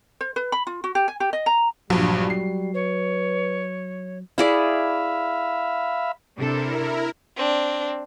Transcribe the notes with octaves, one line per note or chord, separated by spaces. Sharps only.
C5
B4
B5
F4
F#4
G4
G#5
G4
D#5
A#5
A#1 G2 F#3 G3
C7
B4 C#5
E4 G#4 D5 E5 F5 B5
C3 D4 E4 A4 A#4
C4 D4